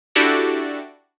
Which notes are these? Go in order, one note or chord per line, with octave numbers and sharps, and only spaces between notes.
D4 E4 F#4 G4 A4 D5